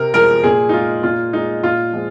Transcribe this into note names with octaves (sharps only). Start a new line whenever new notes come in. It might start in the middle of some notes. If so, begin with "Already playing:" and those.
Already playing: C3 A#4
F3 G#3 A#4
A#2 G#4
D#4
G#3 F4
A#2 F4
G#3 D#4
A#2 F4
F3 G#3